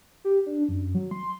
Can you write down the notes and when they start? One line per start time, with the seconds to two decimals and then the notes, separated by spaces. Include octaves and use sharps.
0.25 G4
0.46 D4
0.69 F#2
0.95 F#3
1.11 C6